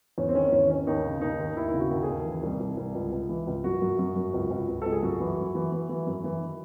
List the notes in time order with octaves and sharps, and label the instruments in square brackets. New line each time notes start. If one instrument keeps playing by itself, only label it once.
[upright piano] E2 C#4
C4
D#3 C#4
E2 C#4
D#3 C#4
D#2 D#4
C#3
D#2 D#4
D#2
D#2 E4
E4
C#3
F#4
D#2
G#4
D#2
E3
C2
C2
C2
C#2
C#2
E3
C#2
F#2 F#4
F#2
F#2
F#2
C#2
C#2
C#2
C#2 A4
G#4
F#2 F#4
E3
F#2
E3
E3
E3
F#2
E3
D#3